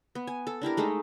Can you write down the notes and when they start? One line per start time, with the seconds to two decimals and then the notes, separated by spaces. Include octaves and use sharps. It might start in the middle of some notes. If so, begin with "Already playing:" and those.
0.15 B3
0.27 G#5
0.47 A4
0.62 D4 E4 G4 A#4
0.77 G#3 A3 D#4 A4